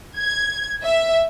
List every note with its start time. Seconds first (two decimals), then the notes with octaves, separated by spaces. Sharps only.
0.18 G#6
0.84 E5